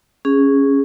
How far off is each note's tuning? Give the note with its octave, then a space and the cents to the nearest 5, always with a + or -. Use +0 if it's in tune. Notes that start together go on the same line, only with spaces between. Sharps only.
C#4 +0 G#4 -10